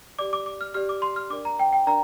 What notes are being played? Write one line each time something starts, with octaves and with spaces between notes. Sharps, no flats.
G4 D5 D6
D6
D6
F6
G4 D5 F6
D6
C6
F6
D4 A#4 D5 D6
A#5
G5
G5
D4 A#4 D5 A#5